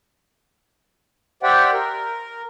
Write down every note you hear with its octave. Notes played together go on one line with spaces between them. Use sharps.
G4 C5 D5 E5 F#5 G5
A#4